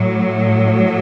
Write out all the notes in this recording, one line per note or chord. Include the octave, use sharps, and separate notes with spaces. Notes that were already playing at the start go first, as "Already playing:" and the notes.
Already playing: A2 F#3